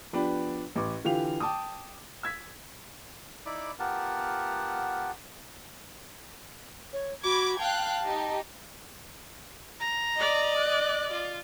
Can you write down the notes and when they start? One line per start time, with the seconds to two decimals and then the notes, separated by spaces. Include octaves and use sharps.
0.13 F3 B3 D4 G4 B4
0.76 A1 B4 D6
1.04 D3 E3 F4 G4 F5 F7
1.40 G5 A5 D6 D#6
2.23 E6 G#6 B6
3.46 D#4 E4 D5 B5 D6
3.80 B3 F4 G4 A#4 F#5 A5
6.93 C#5
7.24 F#4 B5 D6 G#6
7.58 F5 G5 A5 F#6
8.04 D#4 G4
9.80 A#5
10.17 D5 D#5
10.58 F#6
11.11 F4